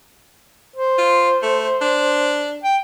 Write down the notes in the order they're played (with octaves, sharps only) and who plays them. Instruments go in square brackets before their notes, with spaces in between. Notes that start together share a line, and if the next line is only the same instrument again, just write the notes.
[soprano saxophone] C5
[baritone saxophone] F4
A3
D4
[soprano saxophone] G5